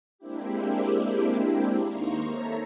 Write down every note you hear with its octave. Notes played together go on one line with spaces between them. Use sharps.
G#3 A#3 C4 D4 E4 G4
D#2 A#3 D#4 C5 A#5 C#6
A4 C#5 E5 A#5